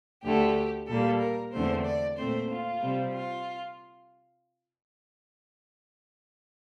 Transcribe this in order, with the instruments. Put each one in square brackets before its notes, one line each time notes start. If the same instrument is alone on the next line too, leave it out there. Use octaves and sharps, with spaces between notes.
[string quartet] D2 D3 A3 G4
A#2 G3 A#3 A4
A#4
E2 D3 A3 C4 C5
D5
A#2 A3 C4 C5
F4
C3 G3 C4
F4